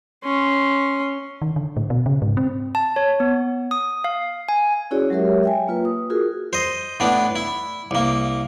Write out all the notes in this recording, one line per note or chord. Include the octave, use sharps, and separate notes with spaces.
C#4 C6
D#3
D3
A2
B2
C#3
G#2
C4
A5
C#5
B3
D#6
F5
G#5
C#4 E4 F#4 G#4 C#5 D5
F#3 G#3 G4 A#4 C#5 E5
E5 G5 G#5
A#3 F4 B4
D#6
F4 F#4 G#4 A#4
C5 D#5
A2 B3 D4
E4
C2 A#3